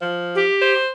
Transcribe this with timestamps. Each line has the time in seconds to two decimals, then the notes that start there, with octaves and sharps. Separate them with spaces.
0.01 F3
0.35 G4
0.62 C5